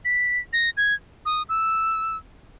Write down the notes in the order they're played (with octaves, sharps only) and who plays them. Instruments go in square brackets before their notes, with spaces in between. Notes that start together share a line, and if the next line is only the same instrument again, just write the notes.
[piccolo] B6
A#6
G#6
D#6
E6